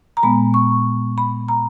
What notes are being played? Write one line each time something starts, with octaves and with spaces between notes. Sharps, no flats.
A#5
A#2 G#3 B3 B5
C#6
B5
A#5